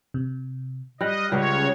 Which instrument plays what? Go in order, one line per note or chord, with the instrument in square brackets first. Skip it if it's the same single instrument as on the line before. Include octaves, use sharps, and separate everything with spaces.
[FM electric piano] C3
[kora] G3 [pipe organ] D#5 [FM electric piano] F6 F#6 A#6
[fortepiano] C#2 [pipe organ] C#3 C#5 [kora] G3